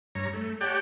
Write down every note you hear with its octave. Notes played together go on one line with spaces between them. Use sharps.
G2 C#5 A#5
A3
G4 C#5 D5 F#5 G5 A5